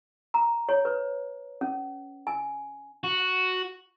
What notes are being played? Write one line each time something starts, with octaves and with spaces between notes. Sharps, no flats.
A#5
C#5
B4
C#4
G#5
F#4